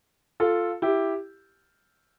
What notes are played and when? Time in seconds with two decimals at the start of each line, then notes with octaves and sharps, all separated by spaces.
0.40 F4 A4
0.82 E4 G4